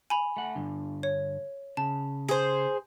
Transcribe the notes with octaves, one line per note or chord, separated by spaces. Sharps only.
G#5 B5 F7
A3 F#5
G2 D3
C#5
C#3 A5
G#4 C5